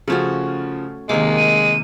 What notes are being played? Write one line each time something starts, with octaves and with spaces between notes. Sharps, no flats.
C#3 F3 A3 C#4 F#4
C3 D#3 G#3 A#3 D6
D#7